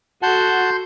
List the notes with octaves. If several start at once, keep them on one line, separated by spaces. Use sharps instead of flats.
F#4 A4 F#5 A5 C6 G6